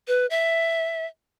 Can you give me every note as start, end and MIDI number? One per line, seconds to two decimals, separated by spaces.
0.07 0.26 71
0.30 1.06 76